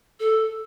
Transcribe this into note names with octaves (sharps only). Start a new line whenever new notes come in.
A4